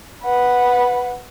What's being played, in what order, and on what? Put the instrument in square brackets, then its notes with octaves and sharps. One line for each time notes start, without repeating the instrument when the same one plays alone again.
[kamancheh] B4 F#5